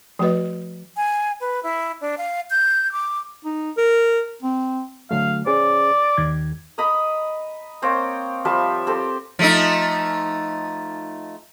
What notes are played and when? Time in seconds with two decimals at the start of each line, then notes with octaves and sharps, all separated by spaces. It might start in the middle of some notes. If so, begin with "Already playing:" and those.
0.19 F3 A3 F#4 B4 D#5
0.97 G#5
1.41 B4
1.63 E4
2.01 D4
2.18 F5
2.50 G6
2.92 D6
3.45 D#4
3.77 A#4
4.42 C4
5.11 D3 F#3 A3 F5
5.46 C#4 G#4 C5 D5
6.18 D#2 D#3 G#6
6.78 D#5 A#5 B5 D#6
7.82 A#3 C4 C#5 G5
8.45 F3 G3 E5 A5
8.87 C4 G4 A4 C6
9.39 F3 A3 D#4